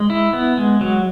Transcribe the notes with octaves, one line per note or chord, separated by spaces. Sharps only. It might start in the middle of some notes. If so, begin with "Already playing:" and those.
Already playing: G#3
E4
B3
G#3
F#3